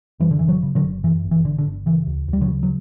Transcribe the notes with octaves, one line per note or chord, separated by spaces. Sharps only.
F#2 E3 G3
D3
F#1 E3
D3 F#3
C#3
D3 F#3
F#1
F#2 E3
G1
E3
D3
D3
G1
C#3 E3
D2
D2
G3
D3 F#3
C#3
F#3